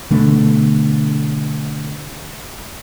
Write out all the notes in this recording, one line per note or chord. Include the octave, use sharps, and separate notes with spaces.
B2 D3 A3